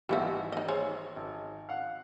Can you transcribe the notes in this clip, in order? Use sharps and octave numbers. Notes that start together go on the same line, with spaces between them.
G#1 E3 G3 B3 F#4 E5
D#4 D#5
G#4 C5 C#5
G#1
F5 F#5